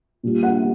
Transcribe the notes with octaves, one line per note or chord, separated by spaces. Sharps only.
A#2 G3
F#5